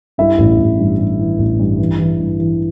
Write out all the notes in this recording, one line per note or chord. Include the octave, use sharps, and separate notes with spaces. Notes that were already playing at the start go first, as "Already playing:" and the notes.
G2 E4 E5
A1
A1
G2
G2
E3
A1
G2
E3
E3
G2
E3